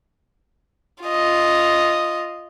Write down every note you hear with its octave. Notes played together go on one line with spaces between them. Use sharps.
F4 D#5